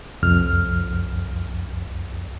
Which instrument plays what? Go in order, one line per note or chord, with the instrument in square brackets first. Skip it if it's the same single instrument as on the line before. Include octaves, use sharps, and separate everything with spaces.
[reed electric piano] C2 F2 F6